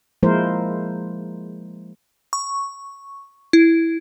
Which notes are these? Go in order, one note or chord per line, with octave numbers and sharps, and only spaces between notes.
F3 G#3 A#3 E4 A#4 C5
C#6
E4